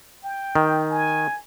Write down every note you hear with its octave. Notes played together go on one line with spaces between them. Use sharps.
G5
D#3
G#5